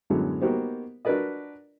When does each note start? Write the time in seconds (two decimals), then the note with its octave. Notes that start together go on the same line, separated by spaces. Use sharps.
0.10 F#2 A2 D3 F#3 G#3 B3
0.42 A#3 B3 D#4 F#4 G4 C5
1.05 D4 F#4 A#4 B4 D5 D#5